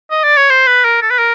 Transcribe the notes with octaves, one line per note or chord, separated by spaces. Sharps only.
D#5
D5
C#5
C5
B4
A#4
A4
B4
A#4